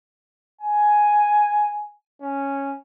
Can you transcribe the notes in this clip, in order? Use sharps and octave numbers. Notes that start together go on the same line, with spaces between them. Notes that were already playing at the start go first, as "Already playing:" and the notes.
G#5
C#4